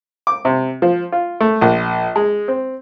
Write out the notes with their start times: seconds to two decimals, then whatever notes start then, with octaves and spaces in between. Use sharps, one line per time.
0.27 D6
0.45 C3
0.82 F3
1.12 F4
1.41 A3
1.61 A#1
2.16 G#3
2.48 C4